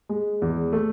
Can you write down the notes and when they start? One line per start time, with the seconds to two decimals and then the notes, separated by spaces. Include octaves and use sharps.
0.09 G#3
0.42 E2
0.73 A3